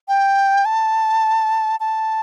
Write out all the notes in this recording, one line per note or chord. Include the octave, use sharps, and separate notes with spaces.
G5
A5
A5